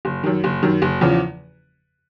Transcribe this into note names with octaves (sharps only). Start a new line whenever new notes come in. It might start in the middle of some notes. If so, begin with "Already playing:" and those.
F#1
F#2 D#3
F#1
F#2 D#3
F#1
E2 C#3 F3